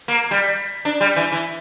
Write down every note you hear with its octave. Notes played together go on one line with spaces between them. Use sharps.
A#3
G3
D4
G3
E3
E3